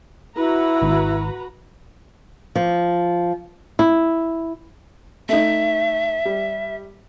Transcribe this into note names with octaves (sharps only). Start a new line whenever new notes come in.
E4 F#4 B4 A#5
G#1
F3
E4
A3 D#4 E5
G3